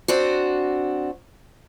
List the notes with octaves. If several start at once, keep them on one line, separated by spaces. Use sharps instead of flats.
C4 D4 F#4